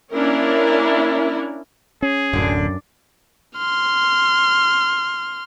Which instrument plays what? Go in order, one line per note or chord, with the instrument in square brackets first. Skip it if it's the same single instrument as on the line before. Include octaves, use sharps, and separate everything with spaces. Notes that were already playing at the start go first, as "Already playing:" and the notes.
[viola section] A#3 C#4 D4 E4 A#4
[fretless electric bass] C#4 [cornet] G#4
[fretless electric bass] D1 [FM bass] F#2 [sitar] D3
[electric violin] C6 F6